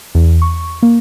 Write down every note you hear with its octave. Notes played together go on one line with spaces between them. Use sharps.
E2
C#6
A#3